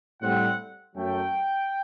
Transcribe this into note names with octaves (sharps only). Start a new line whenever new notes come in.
A2 G3 C4 F#5
F#2 F#3 A3 G5